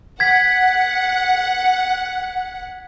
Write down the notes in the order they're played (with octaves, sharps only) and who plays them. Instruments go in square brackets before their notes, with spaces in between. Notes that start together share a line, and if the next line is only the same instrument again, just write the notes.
[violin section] F#5 [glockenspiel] G#6 B6